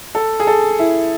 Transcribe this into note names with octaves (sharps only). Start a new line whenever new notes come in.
A4
G#4
A4
E4